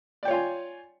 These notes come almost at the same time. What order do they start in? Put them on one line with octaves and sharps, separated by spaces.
D5 G5 C#5 F4 G#5